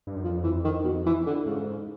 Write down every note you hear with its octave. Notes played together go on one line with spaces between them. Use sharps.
G2
F#2
F2 F3
E3
D#3
B2
E3
D3
G#2 C#3